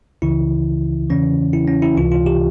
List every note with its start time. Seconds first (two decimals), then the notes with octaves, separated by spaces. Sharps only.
0.22 C#2 C#3 E3 E4
1.10 E2 C#3 E3 C#4
1.53 E4
1.68 C#4
1.82 E4
1.97 C#2 C3 E3 F4
2.12 F4
2.26 G4